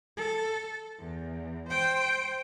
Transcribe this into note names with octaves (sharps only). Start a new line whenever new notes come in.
A4
E2
C5 G5